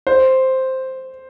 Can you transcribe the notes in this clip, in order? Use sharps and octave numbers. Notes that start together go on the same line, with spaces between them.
C5